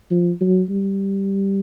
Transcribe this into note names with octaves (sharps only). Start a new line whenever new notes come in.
F3
F#3
G3